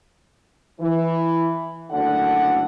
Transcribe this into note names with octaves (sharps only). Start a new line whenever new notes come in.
E3
F#1 D2 D3 D4 F#5